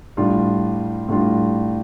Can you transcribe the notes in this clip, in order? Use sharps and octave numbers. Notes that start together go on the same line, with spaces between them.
A2 G3 D4 F4
A2 G3 D4 F4